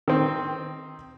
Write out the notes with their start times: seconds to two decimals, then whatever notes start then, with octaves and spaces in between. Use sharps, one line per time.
0.08 D#3 C4